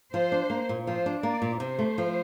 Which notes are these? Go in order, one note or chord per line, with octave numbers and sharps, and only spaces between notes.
F3 C5
D4
A#3
A#2
F3 C5
D4
A#3 D5
A#2
C3 C5
A3
F3